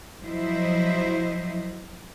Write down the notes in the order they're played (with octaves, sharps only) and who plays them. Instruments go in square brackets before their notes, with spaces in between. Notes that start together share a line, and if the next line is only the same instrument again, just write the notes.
[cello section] F3 F#3 E4 C5 D#5 E5